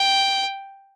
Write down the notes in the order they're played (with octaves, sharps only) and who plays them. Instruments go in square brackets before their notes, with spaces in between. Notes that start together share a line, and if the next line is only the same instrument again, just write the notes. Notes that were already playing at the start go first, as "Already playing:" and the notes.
Already playing: [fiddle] G5